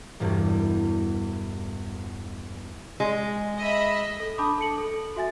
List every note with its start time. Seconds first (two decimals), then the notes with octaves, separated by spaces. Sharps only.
0.20 E1 E2 G2
3.00 G#3
3.59 D#5 E5 B5
4.20 A4
4.38 D4 A5 B5 D6 D#6
4.58 A4 A5 C#7 F#7
4.78 A4
4.91 A4
5.16 F#4 E5 G#5 A6